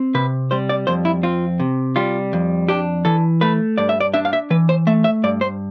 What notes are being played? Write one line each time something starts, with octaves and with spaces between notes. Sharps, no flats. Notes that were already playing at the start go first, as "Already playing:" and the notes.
Already playing: C4
C3 B4
G3 C5
D5
F2 C5
E4
C4 F4
C3
G3 F4
F2
D4 G4
E3 A4
A3 B4
G2 D5
E5
D5
D4 E5
F5
E5
E3 B4
C5
A3 E5
E5
G2 D5
C5